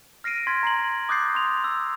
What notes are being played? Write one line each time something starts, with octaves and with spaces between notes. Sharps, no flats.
F6 A#6 C7 D7 D#7
C6 G#6 A6 B6
A#5 C7 F#7
D6 D#6 F#6 G6 A6 C7
C6 F7
E6